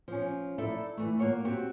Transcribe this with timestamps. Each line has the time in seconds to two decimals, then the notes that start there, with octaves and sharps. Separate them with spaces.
0.08 F3 C#4
0.58 D#4 E4 A4 D5 E5
0.97 E3 A3
1.19 A#3 F4 C#5 F#5
1.45 C4 F#4 G4